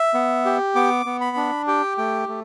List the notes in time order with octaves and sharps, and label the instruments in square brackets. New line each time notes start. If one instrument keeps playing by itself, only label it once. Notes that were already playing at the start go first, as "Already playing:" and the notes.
Already playing: [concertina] E5
B3
G4
B3 D6
B3
B5
D4
G4 G5
A3 G5
A3